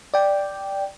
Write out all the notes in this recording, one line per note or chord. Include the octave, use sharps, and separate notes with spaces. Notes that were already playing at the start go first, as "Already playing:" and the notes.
D5 G5